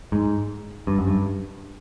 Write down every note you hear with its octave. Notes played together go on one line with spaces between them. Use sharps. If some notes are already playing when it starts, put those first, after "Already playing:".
G#2
G2
F#2
G2